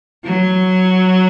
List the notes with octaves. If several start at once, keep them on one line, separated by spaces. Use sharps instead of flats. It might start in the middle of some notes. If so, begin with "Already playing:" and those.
F#3